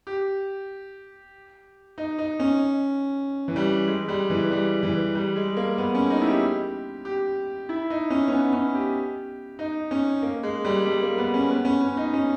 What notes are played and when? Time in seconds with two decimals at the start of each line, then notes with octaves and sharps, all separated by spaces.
0.07 G4
1.98 D#4
2.18 D#4
2.40 C#4
3.48 E3
3.56 G3
3.88 G#3
4.08 G3
4.30 E3
4.51 G3
4.83 E3
5.15 G3
5.36 G#3
5.57 A#3
5.78 B3
5.95 C#4
6.10 D#4
6.21 E4
6.26 G4
7.05 G4
7.69 E4
7.90 D#4
8.10 C#4
8.28 C#4
8.32 B3
8.53 C#4
8.75 G4
9.59 D#4
9.91 C#4
10.22 A#3
10.43 G#3
10.65 G3
10.86 G3
11.03 A#3
11.18 B3
11.34 C#4
11.50 B3
11.65 C#4
11.81 C#4
11.97 D#4
12.13 C#4